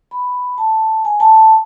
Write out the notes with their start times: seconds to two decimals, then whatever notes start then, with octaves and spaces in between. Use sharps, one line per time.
0.11 B5
0.58 A5
1.05 G#5
1.20 A5
1.35 A5